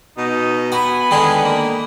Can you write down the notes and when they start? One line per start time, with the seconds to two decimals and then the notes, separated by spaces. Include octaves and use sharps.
0.18 B2 D#4
0.72 B3 F#4 G#5 B5
1.11 D3 D#3 G#3
1.45 A#3